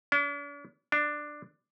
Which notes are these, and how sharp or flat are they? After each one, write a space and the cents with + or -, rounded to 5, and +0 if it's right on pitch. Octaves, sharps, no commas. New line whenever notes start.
D4 -45
D4 +10